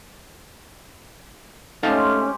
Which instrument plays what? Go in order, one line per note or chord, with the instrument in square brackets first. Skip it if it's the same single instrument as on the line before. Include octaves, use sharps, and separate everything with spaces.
[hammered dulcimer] G#3 C4 G4 [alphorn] A3 [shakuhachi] C#4 [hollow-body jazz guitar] D#4 F5 A5